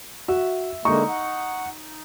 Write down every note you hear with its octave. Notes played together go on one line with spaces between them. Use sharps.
F#4 E5
D3 G#3 A#3 D#4 C#6
F#5